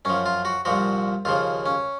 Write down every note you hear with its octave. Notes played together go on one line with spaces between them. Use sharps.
F#2 F3 C#4
F4
F#4
C2 A#2 F3 F#4
D#2 C#3 F3 F4
C#4